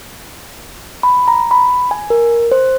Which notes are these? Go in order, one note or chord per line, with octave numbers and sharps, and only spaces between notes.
B5
A#5
B5
G#5
A#4
C5